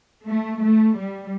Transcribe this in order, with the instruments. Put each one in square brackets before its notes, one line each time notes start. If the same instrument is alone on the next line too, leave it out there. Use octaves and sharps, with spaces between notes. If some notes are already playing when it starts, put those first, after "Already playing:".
[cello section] A3
A3
G3